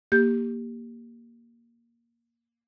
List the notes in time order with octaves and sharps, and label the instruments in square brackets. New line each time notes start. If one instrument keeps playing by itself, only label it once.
[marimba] A#3 G4 G6